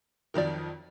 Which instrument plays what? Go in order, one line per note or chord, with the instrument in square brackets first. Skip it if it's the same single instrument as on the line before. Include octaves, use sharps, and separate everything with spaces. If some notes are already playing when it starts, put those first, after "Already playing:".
[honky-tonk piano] F2 D#3 F#3 [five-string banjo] A#4 D5